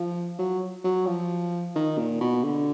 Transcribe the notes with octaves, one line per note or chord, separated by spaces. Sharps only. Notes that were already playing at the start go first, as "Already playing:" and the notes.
Already playing: F3
F#3
F#3
F3
D#3
A#2
B2
D3